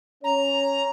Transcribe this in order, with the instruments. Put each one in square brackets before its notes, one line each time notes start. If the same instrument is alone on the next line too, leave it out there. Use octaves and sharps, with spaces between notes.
[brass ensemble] C#4 C#5 [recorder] A#5